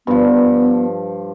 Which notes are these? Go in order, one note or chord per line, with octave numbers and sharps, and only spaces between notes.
G2 F3 B3